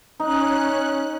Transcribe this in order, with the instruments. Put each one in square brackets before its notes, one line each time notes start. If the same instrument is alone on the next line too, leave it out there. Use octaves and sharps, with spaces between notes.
[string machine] C#4 F#6 [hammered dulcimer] D#4